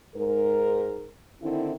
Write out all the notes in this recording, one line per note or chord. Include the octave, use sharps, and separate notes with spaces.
G#2 A#4
D3 D#3 C4 E4